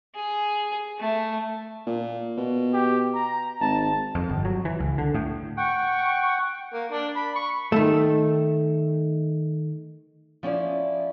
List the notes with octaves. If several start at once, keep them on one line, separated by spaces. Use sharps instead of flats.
G#4
A3
A#2
B2
G4
A#5
G#1 A5
F2
G1
F#3
E3
C#2
D3
A2
F#5 G5 C#6
A#3
D4
B5
C#6
D#3 A3
F3 C#4 E4 D5